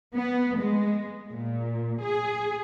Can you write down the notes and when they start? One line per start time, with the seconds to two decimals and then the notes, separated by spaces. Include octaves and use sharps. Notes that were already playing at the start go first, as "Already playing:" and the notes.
0.14 B3
0.57 G#3
1.31 A#2
2.02 G#4